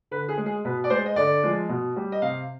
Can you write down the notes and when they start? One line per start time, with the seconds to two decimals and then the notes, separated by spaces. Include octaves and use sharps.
0.11 D3 B4
0.29 G#4
0.38 G#3
0.46 G#4
0.65 B2 B4
0.84 D5
0.90 G#3 C5
1.06 D#5
1.16 D3 D5
1.43 F3 G#3
1.69 B2
1.96 G3
2.12 D#5
2.22 C3 F5